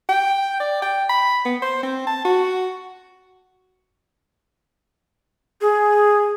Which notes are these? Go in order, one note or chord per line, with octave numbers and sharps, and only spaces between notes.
G5
D5
G5
B5
B3
C5
C4
A5
F#4
G#4